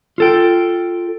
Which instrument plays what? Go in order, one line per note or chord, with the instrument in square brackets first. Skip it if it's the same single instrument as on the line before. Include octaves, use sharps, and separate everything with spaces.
[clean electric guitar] F4 A4 G5